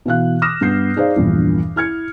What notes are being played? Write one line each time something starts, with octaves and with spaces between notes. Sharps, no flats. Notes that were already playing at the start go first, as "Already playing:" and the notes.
B2 E3 F5 F#6
D6 D#6 F6 A#6 E7
G2 B3 G6 C7
D#4 G#4 C5 D5 F5
A#1 E2 G2 A#2
E4 F6 G#6 C#7